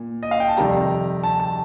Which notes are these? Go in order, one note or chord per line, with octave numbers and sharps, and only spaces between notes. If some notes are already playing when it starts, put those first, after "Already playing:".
Already playing: A#2
D#5
F5
G5
A5
F2 C3 D#3 G3 A#5
A5
A5